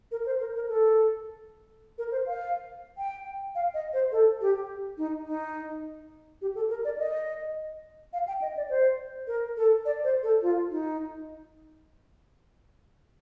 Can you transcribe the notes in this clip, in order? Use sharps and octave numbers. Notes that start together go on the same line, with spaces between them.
A#4
C5
A#4
A#4
A4
A#4
C5
F5
G5
F5
D#5
C5
A4
G4
D#4
D#4
G4
A4
A#4
D5
D#5
F5
G5
D#5
D5
C5
A#4
A4
D5
C5
A4
F4
D#4